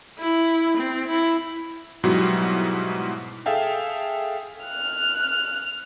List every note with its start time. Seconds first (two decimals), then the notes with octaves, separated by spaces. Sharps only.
0.18 E4
0.77 C4
1.08 E4
2.04 G#2 B2 F#3 G3 E4 F#4
3.46 G#4 A4 E5 F5 G5
4.65 F6 F#6